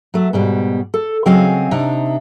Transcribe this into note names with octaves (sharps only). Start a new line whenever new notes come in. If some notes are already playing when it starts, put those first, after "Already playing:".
F#3 A3
G#2 B2 G3
A4
C#3 F#3 C4 D#5 F5 G#5
C3 D4 D#4